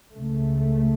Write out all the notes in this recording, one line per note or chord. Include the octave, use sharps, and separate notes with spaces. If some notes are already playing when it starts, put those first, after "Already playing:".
C#2 C#3 A3